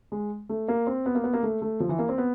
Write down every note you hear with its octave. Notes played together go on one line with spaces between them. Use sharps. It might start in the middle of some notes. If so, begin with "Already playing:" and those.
G#3
A3
A#3
C4
B3
A#3
B3
A#3
A3
A3
F3
E3
A#3
C4
B3